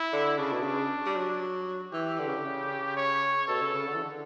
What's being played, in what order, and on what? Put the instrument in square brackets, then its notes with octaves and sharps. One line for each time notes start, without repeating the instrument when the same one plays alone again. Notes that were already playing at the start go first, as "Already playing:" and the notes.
Already playing: [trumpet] E4
[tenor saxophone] D3
[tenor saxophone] C#3 [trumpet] D4
[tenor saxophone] B2
C#3
G3
F#3
[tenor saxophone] E3 [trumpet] G4
[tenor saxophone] D3
C#3
D3
C#3
[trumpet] C#5
[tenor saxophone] B2 [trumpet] A4
[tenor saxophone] C#3
C#3
D3
E3
D3